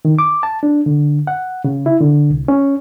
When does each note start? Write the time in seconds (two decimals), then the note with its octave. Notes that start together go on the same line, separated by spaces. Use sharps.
0.05 D#3
0.19 D6
0.43 A5
0.63 D4
0.86 D3
1.27 F#5
1.64 C#3
1.86 E4
2.01 D3
2.30 C2
2.48 C#4